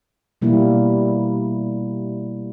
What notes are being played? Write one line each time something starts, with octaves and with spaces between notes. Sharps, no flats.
B2 G3 A#3 E4